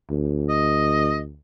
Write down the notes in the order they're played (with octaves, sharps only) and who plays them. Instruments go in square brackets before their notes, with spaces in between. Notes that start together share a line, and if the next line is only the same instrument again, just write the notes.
[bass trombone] D2
[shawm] D#5